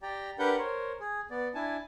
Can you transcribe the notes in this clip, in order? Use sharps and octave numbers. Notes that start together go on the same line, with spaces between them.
G4 D5 G5 A#5
D4 G4 A#4 B4 F#5 G6
A#4 C5 C#5
G#4
B3 D5
D4 E4 G#5 A5